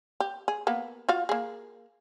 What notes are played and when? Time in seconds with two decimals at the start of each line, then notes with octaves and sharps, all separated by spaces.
0.20 G4
0.48 G#4
0.67 A#3 B3
1.09 F4 F#4 F5
1.29 A#3 G#4